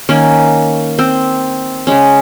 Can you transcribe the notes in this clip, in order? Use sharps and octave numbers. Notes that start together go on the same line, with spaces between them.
D#3 A#3 C#4
C4
C#3 G#3 C#4